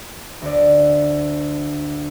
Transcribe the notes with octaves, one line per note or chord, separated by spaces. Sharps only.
D2 D5